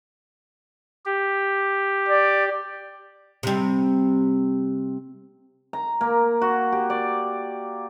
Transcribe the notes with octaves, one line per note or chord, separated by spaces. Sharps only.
G4
D5
C3 G3
A#5
A#3
F#4
G4
D5